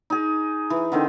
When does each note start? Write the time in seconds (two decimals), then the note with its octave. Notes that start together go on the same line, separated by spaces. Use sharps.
0.10 D#4 G#4
0.70 E3
0.92 D3 D#3 C4